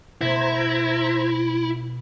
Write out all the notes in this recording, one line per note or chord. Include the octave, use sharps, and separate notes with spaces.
B2 A3 E4 C5 A#5 G#6